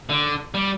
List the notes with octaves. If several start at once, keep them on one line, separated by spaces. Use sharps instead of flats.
D3
G3